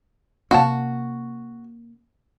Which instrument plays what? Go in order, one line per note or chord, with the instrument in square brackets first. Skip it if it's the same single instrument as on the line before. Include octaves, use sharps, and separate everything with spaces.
[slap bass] C3 A#3 C#4 [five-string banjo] F#4 [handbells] F5 F#5 A5